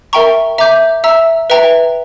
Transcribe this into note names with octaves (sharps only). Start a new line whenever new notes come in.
A#4 E5 G5 A#5 C#6
E5 A#5 D6 G6
E5 A#5 E6
B4 E5 G5 A#5